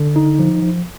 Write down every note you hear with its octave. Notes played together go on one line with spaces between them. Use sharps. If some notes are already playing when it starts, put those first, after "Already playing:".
Already playing: D3
D#4
F3
F3